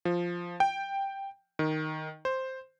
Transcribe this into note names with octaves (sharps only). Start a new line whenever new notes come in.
F3
G5
D#3
C5